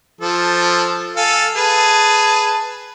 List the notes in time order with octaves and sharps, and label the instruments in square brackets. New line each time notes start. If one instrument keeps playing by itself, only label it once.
[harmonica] F3 A4
A4 F5 G#5
G#4 B4 A5